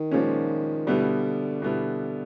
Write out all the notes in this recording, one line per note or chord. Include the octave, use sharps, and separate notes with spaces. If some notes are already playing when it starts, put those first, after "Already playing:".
Already playing: D#3
A#2 F3 G#3 C#4
B2 D3 G3 B3 E4
B2 G3 B3 E4